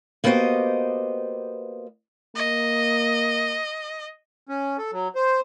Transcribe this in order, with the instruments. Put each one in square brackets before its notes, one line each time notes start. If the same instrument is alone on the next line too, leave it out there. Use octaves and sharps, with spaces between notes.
[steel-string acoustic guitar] A#3 B3 F#4 G4 C5 D#5
[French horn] A#3 [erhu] D#5
[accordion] C#4
A4
F#3
C5